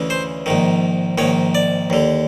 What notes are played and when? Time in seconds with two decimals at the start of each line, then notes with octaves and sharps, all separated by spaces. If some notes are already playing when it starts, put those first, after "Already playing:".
Already playing: D2 C#3 E3
0.10 C5
0.46 A#1 G#2 D#3
1.18 A#1 G#2 D#3 C#5
1.55 D5
1.90 D#2 D3